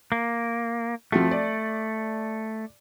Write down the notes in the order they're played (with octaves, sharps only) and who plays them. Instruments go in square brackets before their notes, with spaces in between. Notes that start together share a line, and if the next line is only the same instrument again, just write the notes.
[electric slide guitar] A#3
[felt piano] F3 C4 F#4 [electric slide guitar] A3
[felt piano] D5